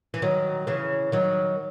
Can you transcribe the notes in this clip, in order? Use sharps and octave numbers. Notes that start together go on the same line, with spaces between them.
E3
D#3 F#3
C#3 E3
D#3 F#3